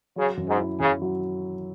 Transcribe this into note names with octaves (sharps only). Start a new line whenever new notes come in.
C#3 F#3
F#2
G#2
E4
F#2 C#3
F#3